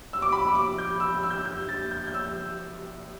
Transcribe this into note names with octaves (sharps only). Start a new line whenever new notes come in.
E6
D6
B5
D6
G6
E6
E6
G6
E6
G6
A6
G6
G6
E6